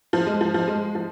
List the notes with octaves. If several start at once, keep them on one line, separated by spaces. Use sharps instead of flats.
F3
G#3
F3
F3
G#3
F3